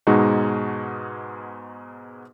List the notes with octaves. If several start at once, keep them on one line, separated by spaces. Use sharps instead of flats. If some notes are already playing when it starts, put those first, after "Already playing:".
G#2 B2 G#3 D#4 F#4